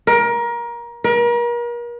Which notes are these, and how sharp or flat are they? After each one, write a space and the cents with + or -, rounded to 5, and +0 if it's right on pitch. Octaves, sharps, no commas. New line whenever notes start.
A#4 +25
A#4 +40